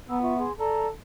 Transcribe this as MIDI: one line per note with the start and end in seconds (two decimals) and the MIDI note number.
0.09 0.46 59
0.09 0.19 82
0.09 0.19 83
0.09 0.19 88
0.22 0.37 65
0.22 0.37 76
0.22 0.37 85
0.39 0.52 68
0.39 0.52 84
0.59 0.90 69
0.59 0.87 74
0.59 0.87 82